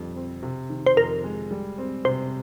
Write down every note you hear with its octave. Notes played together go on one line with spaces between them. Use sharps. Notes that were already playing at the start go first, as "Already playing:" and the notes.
Already playing: F2 D3 G3
C4
C3
D#3
C5
F2 A#4
G#3
G3
C4
C3 C5